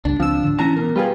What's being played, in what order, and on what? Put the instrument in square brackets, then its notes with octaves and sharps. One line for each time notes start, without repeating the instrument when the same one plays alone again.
[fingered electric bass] C#2 G2 [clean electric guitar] D4
[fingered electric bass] C#2 C4 [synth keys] F3 E6
[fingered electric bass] A2 D3
[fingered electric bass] E3 [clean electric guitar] C#4 E4 A5 [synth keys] A#5
[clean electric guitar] B2 A#4
[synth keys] G3 F4 G#4 [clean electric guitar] G4 B4